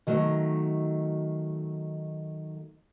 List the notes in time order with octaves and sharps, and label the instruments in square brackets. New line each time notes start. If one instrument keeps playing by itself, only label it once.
[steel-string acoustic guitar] D#3 F#3 A3